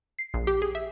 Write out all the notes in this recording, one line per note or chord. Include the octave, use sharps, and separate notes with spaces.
C7
A#1
G4
G#4
E5